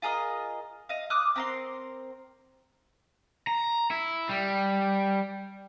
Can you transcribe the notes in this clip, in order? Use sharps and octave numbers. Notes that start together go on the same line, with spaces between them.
F4 G#4 A#4 D#5
D#5 F5
D6 D#6 F6 F#6
C4 A#4 C6
A#5
E4
G3